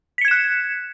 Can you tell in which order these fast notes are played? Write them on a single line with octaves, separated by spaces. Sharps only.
B6 C#7 G#6 E7 F#6